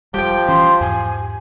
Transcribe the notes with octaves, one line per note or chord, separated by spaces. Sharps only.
F1 F3 G3 G4 G5
E3 C#4 C6
E2 G#2 G#5